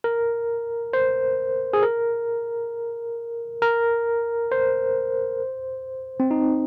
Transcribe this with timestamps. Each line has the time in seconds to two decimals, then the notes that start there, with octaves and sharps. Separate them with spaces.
0.04 A#4
0.93 C5
1.73 G#4
1.83 A#4
3.62 A#4
4.52 C5
6.20 C4
6.31 D#4